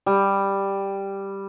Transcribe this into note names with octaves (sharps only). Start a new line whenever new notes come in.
G3